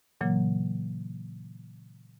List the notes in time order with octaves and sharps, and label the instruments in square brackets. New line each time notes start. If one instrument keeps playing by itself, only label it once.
[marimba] A#2 C#3 E3 F#3 A#3